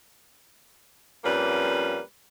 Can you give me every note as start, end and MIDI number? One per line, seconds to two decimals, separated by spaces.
1.24 2.00 41
1.24 2.00 55
1.24 2.00 58
1.24 2.00 61
1.24 2.00 71